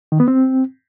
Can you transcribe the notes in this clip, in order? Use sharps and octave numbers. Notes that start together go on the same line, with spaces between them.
D#3
B3
C4